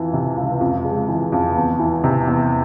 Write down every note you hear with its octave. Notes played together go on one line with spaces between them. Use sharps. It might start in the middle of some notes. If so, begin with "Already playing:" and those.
Already playing: F2 E3
C3
C#2
F2
G#3
E3
F2
E2
E3
C3
E2